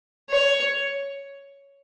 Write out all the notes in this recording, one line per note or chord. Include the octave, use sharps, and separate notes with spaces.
C#5